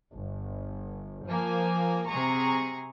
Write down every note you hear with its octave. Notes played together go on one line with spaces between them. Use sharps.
G1
F3 A#3 G#5
C3 G#4 A#5 C#6